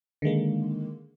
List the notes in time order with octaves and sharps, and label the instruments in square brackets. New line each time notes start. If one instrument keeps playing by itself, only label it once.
[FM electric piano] D3 D#3 G#3 A#3